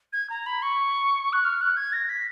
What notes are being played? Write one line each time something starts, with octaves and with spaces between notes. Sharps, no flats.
G#6
A#5
B5
C#6
F#6
F6
F#6
G#6
A#6
B6